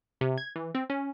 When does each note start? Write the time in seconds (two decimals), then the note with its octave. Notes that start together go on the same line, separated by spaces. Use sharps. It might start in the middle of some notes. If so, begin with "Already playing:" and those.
0.21 C3
0.38 G#6
0.56 E3
0.75 C4
0.90 C#4